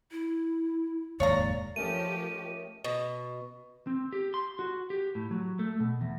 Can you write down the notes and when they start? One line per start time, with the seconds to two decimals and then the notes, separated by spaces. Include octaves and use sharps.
0.12 E4
1.20 F1 D#2 G#2 C#5 D5 F5 A#5
1.76 F3 A3 C#4 G4 A#4 D#5 D#7
2.84 B2
3.87 C4
4.13 G4
4.34 C6
4.59 F#4
4.90 G4
5.15 A2
5.31 F#3
5.59 A3
5.80 B2
6.01 E2